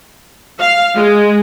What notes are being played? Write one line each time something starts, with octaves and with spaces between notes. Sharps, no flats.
F5
G#3